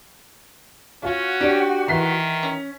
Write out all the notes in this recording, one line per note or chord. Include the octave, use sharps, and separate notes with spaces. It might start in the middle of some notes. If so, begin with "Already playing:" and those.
C#4 F4 F#4
D4 G4
D#3 E3 C6 B6
C#4